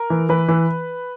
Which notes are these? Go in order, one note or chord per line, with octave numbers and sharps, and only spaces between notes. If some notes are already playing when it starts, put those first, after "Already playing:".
Already playing: A#4
E3
E3 B4
E3